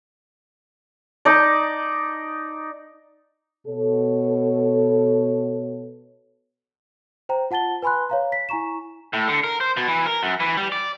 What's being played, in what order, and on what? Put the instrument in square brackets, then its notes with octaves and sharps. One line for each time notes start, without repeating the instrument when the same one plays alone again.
[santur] D#4 D5
[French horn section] B2 A4 C#5
[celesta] C5 G5 A#5
F4 F#5 A5 A6 G7
B4 G#5 B5 C6 F#6
C#5 F5 A#5
B6
E4 G#5 A#5 C#6 E7
[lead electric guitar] A2
D3
A#4
C5
B2
E3
A#4
F#2
E3
G3
D5